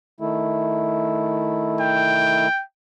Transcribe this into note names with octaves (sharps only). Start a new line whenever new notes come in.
D#3 A3 E4
G5